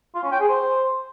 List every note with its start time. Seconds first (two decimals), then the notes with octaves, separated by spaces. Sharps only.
0.15 F4
0.23 C#4
0.32 G5
0.40 G#4
0.48 C5